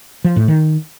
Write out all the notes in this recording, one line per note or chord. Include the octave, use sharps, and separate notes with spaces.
F3
A2
D#3